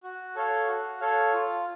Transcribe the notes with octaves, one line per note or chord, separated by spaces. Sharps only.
F#4
A4 C#5 F5
F#4
A4 C#5 F5
F4